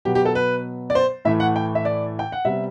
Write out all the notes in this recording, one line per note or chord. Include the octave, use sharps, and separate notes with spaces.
B2 F#3 B3 G4
G4
A4
B4
D5
C5
A2 E3 A3 E5
F#5
G5
E5
D5
G5
F#5
C3 G3 B3 E5